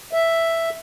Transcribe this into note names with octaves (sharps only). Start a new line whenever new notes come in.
E5